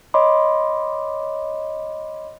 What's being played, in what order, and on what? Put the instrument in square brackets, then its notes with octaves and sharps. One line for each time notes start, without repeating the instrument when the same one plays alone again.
[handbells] C#5 D#5 B5 C6 D6